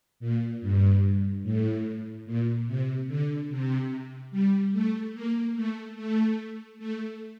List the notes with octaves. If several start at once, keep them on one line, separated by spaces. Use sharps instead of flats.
A#2
G2
A2
A#2
C3
D3
C3
G3
A3
A#3
A3
A3
A3